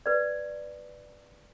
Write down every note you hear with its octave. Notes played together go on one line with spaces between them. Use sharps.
B4 D5